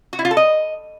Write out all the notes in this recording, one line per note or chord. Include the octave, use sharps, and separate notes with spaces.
F#4
E4
F4
A4
D#5